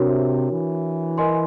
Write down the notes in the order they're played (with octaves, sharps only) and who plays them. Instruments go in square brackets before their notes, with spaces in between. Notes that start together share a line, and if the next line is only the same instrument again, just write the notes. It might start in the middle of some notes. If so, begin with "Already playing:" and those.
Already playing: [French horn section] C3 [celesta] D4 F#4 A#4 C#5
[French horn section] E3
[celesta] A#4 D#5 G#5 C6